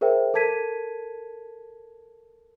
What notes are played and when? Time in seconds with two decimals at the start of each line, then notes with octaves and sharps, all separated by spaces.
0.01 G#4 A#4 C5 E5 G5
0.34 A4 A#4 A5 G#6 B6 D#7